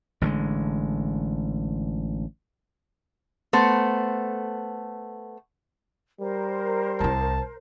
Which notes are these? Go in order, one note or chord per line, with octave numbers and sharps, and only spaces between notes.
A1 D3 F3 G#3
A3 B3 C5
G3 A#4 C5
C2 E4 A5